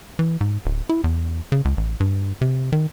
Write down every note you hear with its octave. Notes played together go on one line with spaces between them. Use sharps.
E3
G#2
D1
E4
E2
C#3
C#2
A1
G2
C3
D#3